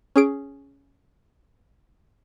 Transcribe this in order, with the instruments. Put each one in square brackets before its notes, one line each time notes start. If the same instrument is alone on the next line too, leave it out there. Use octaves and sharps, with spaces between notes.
[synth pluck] C#4 G#4 D7